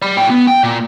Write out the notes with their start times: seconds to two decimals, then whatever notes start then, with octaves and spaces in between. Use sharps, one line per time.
0.02 D5 B5
0.17 A#2 G5
0.30 B3
0.47 G5
0.63 A#2